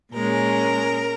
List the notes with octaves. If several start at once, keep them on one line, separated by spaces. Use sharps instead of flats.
A#2 G#3 C#4 A#4